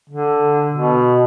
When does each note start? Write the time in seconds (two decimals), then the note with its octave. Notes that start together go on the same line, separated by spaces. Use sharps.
0.10 D3
0.73 B2